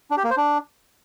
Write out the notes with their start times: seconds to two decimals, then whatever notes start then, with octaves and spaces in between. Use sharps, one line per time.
0.11 D4
0.17 G4
0.24 A#3
0.31 C5
0.37 D4